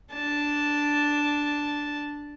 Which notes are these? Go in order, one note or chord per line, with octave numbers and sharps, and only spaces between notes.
D4 A5